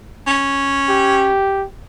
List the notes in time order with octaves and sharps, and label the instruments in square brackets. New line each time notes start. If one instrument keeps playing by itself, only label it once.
[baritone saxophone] C#4
[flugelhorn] G4